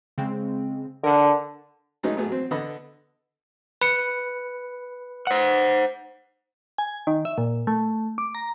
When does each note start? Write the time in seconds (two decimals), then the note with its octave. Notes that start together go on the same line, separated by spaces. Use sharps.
0.18 C#3 G#3 C4
1.04 D3 A#4 F#5
2.03 F#3 G#3 A3 B3 C#4 D#4
2.17 A2 F#3 A3 B3 G#4
2.29 F#3 C4
2.51 D3 B3 A4 D#5 B5
3.81 B4 C#7
5.27 C5 F#5
6.78 G#5
7.07 D#3
7.25 E5
7.38 A#2
7.67 A3
8.18 D6
8.35 A#5